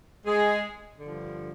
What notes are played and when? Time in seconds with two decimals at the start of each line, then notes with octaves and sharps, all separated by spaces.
0.25 G#3 G#4
0.99 G2 D3 F3